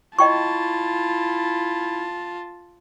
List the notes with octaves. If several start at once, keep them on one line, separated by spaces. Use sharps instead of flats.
E4 F4 D#5 G5 A5 C#6